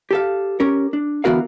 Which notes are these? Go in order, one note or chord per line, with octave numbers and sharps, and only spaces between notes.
G4 A4 F5
C#4 G4 A#4
D4
D3 E3 B3 F#4 A#4 F5